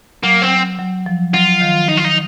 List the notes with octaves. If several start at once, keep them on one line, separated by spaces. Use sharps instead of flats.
F#3 A#3
C4
F#3
F3
F#3 F4
D#3
D#4
F4
D#4